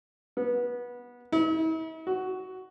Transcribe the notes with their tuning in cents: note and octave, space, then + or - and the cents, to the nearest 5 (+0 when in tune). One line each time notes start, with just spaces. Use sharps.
B3 -20
E4 -45
F#4 +10